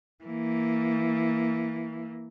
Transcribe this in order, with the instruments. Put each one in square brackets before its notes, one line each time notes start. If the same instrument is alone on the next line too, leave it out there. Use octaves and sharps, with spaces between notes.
[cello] E3 A#3